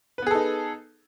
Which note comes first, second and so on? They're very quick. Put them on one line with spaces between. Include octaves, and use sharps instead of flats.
B4 B3 G#4 A4 D#4